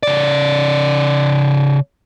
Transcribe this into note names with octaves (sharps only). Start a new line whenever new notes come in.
C#3 D5